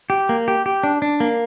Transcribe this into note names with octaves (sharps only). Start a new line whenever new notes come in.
G4
A#3
G4
G4
D4
D4
A#3